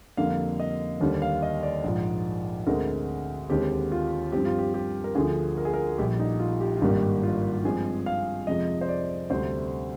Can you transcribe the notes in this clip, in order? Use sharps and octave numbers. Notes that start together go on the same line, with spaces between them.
F2 D3 G3 A#3 F5
D#5
D#2 D3 G3 A#3
F5
D#5
D5
A#1 G#2 F3
D2 D3 G#3 C4 A#4
D#2 D3 G#3 C4 G4
F4
G2 F3 C4 G4
F4
G4
G4
A#4
D2 D3 F3 G#4
A#4
G#4
A#4
A#1 A#2 G3 G4
D#4
F4
G4
F4
G#1 G2 D#3 G3 A#3 G4
F4
G2 F3 G#3 C4 G#4
F5
F2 C3 F3 G#3 D#5
C5
D5
D2 C3 G3 C4 C5